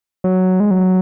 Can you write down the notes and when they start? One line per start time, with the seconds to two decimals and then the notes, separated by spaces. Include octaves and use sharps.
0.24 F#3
0.60 G#3
0.71 F#3